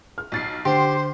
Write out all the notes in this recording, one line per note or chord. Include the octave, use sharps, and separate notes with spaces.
F6
B1 A6 C7
D3 G4 C5 C6